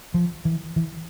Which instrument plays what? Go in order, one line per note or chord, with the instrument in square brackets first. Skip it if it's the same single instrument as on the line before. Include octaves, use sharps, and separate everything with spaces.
[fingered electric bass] F3
E3
E3